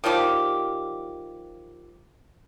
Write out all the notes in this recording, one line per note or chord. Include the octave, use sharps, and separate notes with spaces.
D#3 F3 G3 G4